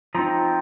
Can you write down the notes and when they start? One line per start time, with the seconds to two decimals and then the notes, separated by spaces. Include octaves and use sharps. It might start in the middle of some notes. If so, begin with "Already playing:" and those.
0.15 F3 C4 D#4 A#5